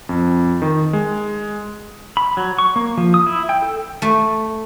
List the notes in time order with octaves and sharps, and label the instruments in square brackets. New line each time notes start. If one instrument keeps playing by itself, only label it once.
[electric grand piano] F2
D#3
G#3
[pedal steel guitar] B5
F#3
C#6
A#3
F3
D#6
E4
G5
A4
[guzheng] A3